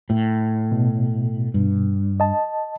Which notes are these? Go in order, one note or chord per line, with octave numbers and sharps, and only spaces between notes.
A2
B2
G2
D#5 A5